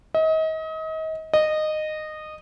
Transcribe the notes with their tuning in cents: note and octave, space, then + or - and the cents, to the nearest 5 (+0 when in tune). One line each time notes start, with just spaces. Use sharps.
D#5 +35
D#5 -15